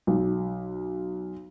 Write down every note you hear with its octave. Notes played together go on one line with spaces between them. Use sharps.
B1